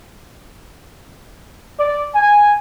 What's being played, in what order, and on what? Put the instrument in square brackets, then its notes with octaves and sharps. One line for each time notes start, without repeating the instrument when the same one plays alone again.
[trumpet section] D5
G#5